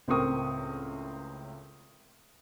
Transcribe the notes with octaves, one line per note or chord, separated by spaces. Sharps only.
C#2 A2 C4 A#4 C#6 D#6